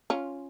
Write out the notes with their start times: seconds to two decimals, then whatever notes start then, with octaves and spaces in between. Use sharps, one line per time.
0.10 C#4 F4